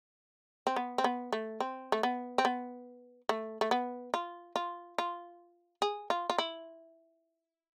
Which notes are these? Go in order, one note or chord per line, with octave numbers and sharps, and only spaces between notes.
C4
B3
C4
B3
A3
C4
A3
B3
C4
B3
A3
A3
B3
F4
F4
F4
G#4
F4
F4
E4